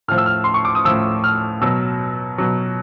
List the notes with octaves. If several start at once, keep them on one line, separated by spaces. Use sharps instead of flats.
A2 F3 F6
E6
F6
C6
C#6
D6
D#6
A2 F3 E6
F6
B2 F#3 E6
B2 F#3